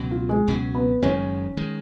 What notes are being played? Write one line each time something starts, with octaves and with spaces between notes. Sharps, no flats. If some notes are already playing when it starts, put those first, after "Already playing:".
Already playing: C#2 B2 F#3 C#4
F4
G#3
C#2 B2 F#3 C#4
B3
F#1 F#2 D#3 G#3 C#4
D#3 G#3